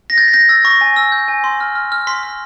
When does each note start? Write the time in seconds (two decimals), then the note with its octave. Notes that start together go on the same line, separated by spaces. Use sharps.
0.10 A#6
0.18 G6 A6
0.28 B6
0.33 G6 A#6
0.49 E6 A6
0.65 C#6 A#6
0.81 G#5
0.96 E6
1.12 G6
1.28 G#5
1.44 C6
1.60 F6
1.75 F6
1.92 F6
2.07 C6 B6
2.23 F6